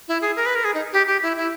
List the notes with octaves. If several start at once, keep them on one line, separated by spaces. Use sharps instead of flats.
E4
G#4
A#4
B4
A#4
G#4
D#4
G4
G4
E4
E4